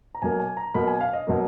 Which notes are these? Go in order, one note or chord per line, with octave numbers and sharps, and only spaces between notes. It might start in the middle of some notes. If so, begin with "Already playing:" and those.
A#5
B2 F#3 A#3 G#5
G#5
A#5
B2 F#3 A#3 B5
G#5
F5
D#5
B2 F#3 A#3